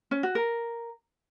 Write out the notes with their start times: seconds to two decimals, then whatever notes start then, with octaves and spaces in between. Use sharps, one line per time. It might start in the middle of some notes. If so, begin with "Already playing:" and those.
0.11 C#4
0.23 F#4
0.35 A#4